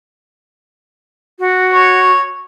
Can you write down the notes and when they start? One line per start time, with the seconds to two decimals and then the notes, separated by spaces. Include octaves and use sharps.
1.39 F#4
1.74 C#5